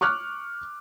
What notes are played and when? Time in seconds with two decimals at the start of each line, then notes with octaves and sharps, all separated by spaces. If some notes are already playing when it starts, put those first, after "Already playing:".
0.01 C#6 D6 F6 F#6